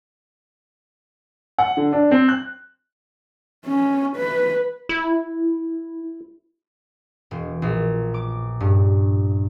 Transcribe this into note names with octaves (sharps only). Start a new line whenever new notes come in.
F#5
D3
D4
C4
F#6
C#4
B4
E4
E1
A#1
D6
G2